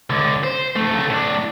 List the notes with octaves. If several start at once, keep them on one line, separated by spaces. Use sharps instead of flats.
C#2 D3
C5
F2 A3
C#2 A3
A2 D4